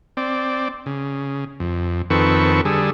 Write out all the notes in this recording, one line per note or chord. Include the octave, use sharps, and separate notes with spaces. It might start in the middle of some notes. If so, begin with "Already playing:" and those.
C4 D5
C#3
F2
F2 D#3 C4 A4 B4 C#6
D3 G3 G#4 A4